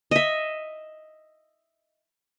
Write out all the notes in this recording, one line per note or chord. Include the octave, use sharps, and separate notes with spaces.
D#5 E5